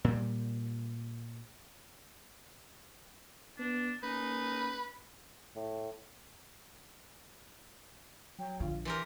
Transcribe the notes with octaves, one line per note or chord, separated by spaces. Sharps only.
A#2 G3
B3 D4
A#3 C#4 D#4 B4
A2
F#3 G5
A#1 D3 F4
E3 G4 A#4 C6